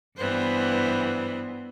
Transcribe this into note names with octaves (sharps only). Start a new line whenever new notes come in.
G2 E3 G3 B3 C5